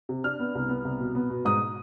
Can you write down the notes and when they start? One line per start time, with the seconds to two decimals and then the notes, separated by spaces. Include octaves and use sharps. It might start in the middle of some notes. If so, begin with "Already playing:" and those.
0.09 C3
0.24 D4 F6
0.39 B3
0.55 C2
0.69 B3
0.85 C2
1.00 B2
1.15 B3
1.30 B2
1.45 G#2 D#6